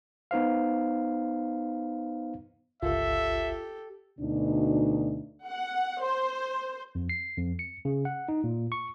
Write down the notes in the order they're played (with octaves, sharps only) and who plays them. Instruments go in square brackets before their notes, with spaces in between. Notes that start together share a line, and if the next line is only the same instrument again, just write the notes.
[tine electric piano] B3 D#4 C5 F5
[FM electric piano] G1 C#2 F4 [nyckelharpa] G4 A4 [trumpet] E5
[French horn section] D2 B2 D4 D#4
[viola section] F#5
C5
[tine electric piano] F2
C7
F2
C#7
C#3
F#5
D#4
A#2
C#6